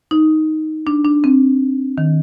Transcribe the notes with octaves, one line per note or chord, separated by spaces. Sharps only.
D#4
D4
D4
C4
D#3